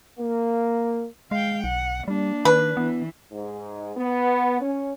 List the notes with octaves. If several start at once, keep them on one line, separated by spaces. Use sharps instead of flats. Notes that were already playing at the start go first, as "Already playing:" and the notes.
A#3
G#3 F5 G5
B1 F#5
G3 A#3 D4
D#3 B4
E3 B3
G#2
B3
C#4